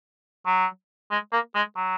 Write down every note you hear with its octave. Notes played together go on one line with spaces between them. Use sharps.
F#3
G#3
A#3
G#3
F#3